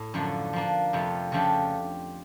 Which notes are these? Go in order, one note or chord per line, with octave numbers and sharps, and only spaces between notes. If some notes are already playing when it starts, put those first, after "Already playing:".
Already playing: A2
F#2 D3 F3 A3 D4
F3 A#3 D4
F2 C3 F3 A3
C#3 F3 A3 D4 G4